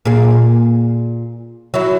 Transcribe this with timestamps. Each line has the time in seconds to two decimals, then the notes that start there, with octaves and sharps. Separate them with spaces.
0.05 A#2 G#4
1.74 F#3 E4